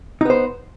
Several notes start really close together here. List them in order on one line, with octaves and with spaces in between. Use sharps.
D#4 B3 C5